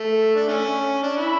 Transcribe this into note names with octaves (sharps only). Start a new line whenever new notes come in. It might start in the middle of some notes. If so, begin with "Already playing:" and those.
Already playing: A3
D4
A3 C#4
D4
E4